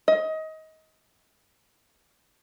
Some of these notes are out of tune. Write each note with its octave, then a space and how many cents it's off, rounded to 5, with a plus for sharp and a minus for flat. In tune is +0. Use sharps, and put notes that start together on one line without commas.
D#5 +25